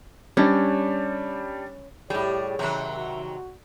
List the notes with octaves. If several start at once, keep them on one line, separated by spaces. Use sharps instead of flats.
G3 C#4 D4
A2 G3 G4 G#4 C#5
C3 D#3 F#3 E5
F#4